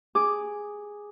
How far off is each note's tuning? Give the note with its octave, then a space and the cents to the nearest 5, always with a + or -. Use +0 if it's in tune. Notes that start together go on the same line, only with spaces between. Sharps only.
G#4 -5 D6 +0